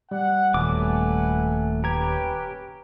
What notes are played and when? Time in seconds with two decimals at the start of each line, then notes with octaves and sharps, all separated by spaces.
0.11 G3 F#5
0.54 D#1 F#3 A3 B4 F#5 G#5 D6
1.84 C#4 G4 B4 A#5 G#6